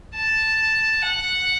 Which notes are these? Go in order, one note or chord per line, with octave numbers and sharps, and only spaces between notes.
A5
F#5